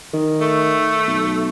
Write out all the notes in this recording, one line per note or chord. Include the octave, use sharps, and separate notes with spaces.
D#3
A3
B1